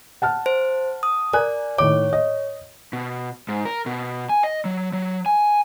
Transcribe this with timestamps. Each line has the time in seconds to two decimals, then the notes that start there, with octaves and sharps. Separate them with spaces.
0.22 F#5 A5 F6
0.46 C5
1.03 D#6
1.33 A#4 D5 G#5 F#6
1.78 A2 D#3 C#5 D6
2.13 D#5
2.93 B2
3.49 G#2
3.65 A#4
3.86 B2
4.29 G#5
4.44 D#5
4.65 F#3
4.93 F#3
5.26 G#5